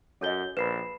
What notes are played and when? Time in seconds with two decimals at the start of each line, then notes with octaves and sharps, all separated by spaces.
0.21 F#2 A4 C#5 D#5 G6 G7
0.57 A#1 B4 B5 C7 E7